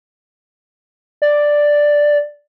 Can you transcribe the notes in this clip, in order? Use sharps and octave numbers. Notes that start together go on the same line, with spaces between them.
D5